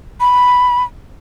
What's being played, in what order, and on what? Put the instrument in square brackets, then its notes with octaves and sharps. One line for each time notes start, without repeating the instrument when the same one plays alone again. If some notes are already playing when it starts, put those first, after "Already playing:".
[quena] B5